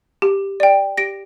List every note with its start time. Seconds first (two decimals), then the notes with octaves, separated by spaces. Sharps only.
0.22 G4
0.60 D5 G5
0.97 G4 A#6 D7